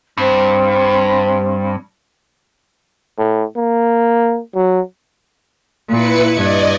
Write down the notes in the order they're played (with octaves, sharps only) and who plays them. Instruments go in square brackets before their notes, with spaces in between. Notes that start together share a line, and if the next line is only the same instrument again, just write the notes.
[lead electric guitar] G2 [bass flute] C4
[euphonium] A2
A#3
F#3
[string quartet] A#2 [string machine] E4 B4 C#7
[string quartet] G2 G#6 [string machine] D5 D#5